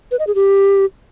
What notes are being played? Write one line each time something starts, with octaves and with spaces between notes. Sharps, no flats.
B4
D#5
G#4
G4